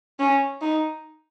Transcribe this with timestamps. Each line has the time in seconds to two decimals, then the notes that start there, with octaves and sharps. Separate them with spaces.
0.19 C#4
0.62 D#4